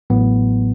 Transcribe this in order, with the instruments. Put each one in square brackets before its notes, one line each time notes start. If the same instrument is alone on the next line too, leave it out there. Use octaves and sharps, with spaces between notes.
[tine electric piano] A1 A2 F#3 B3